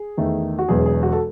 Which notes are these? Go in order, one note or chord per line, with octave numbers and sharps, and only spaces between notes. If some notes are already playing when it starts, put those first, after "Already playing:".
Already playing: G#4
E2 D#3 A3
F#4
E1 E2 B2 F#3 G#4
G#4
F#4
A4